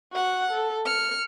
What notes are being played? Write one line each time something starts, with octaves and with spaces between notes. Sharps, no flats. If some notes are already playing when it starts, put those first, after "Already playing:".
F#4 F#5
A4
F6 C#7